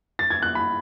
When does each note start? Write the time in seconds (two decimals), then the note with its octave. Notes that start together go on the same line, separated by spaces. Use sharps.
0.19 A6
0.30 G#6
0.42 F#6
0.55 B5